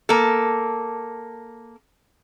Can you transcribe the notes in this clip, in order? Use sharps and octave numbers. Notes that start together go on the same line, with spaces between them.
A#3 A4